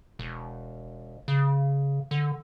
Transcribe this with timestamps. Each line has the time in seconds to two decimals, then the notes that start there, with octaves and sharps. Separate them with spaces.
0.19 E1
1.28 C#3
2.11 D3